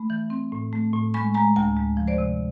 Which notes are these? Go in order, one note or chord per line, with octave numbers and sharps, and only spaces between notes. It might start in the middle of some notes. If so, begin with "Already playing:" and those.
Already playing: A3 B5
E3
C4
A2
A3
A2
G#3 B5 C#6
G#3 G#5 A#5
D2 G5 A5
G#3
F3
C5 D5
C3